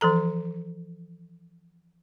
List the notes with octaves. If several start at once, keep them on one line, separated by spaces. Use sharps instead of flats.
E3 F3 A4 A#5